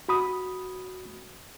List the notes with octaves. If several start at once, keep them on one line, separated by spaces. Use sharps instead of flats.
F#4 B5 D#6